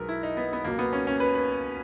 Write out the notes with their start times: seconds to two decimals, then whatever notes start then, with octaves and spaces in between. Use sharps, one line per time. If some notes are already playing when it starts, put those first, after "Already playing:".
Already playing: B1 B2 G#3 A#4 B4
0.09 E4
0.23 D#4
0.37 B3
0.53 B3
0.64 C#2 B2 F#3 A#3
0.79 B3
0.93 C#4
1.07 C#4
1.20 B4
1.35 B4